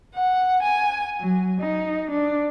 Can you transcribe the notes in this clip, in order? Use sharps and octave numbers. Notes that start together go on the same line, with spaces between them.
F#5
G#5
F#3
D#4
D4